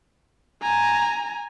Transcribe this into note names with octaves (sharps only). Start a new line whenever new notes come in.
G#5 A#5